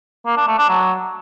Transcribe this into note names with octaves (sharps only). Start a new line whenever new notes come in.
A#3
D4
A3
D4
F#3